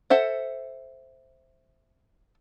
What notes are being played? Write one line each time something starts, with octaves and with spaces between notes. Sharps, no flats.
A4 C5 E5 F#5